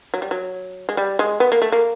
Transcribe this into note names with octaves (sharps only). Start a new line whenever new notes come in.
F#3
G3
F#3
G#3
G3
G#3
B3
A#3
A3
A#3